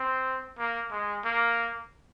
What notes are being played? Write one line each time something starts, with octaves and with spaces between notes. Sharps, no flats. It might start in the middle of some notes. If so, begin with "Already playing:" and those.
Already playing: C4
A#3
G#3
A#3